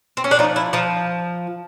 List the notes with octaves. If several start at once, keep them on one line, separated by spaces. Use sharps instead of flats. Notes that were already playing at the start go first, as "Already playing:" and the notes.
C4
C#4
D4
F3 D#4
E4
F3 D#4